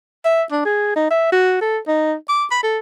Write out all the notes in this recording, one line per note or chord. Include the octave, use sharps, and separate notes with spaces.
E5
D4
G#4
D#4
E5
F#4
A4
D#4
D6
B5
A4